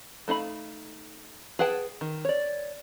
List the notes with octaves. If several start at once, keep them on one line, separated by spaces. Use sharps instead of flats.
A3 D#4 F5 B5
G#4 B4 F#5 G5 A5
D#3
C#5 D5